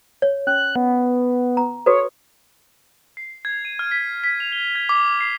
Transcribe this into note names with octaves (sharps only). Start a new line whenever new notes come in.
C#5
C#4 F#6
B3
A#5
F#4 A4 B4 C#5
C7
G#6
D#7
F6
B6
B6
F7
G7
G#6
D6
C7